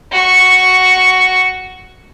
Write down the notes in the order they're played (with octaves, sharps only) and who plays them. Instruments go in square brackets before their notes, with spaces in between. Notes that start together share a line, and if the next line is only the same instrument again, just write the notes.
[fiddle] F#4 C#6